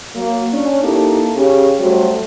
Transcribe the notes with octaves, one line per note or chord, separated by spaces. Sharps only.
F#3 A#3
C#4 D4
A#3 D#4 E4 G4 A4
C#3 C#4 G4
F#3 G3 A3 F#4 C5